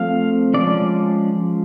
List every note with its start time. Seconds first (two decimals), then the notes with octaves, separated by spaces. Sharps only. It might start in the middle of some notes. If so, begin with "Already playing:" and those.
Already playing: F3 A3 C4 F5
0.54 F3 G#3 C#4 D5